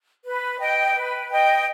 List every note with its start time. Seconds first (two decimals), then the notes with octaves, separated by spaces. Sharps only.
0.24 B4
0.59 D#5 G5
0.95 B4
1.30 D#5 G5